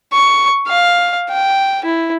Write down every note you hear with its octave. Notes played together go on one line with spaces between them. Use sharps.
C#6
F5
G5
E4